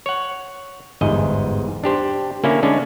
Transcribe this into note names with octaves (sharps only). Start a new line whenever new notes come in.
C#5 F#5
G1 E2 G#2 D#5
D4 G4 C5
D3 A#3 C#4 E4
D3 G#3 C#4 D4